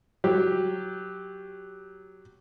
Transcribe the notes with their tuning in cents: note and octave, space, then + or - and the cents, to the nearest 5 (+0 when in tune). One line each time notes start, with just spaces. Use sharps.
F#3 +0 G4 +0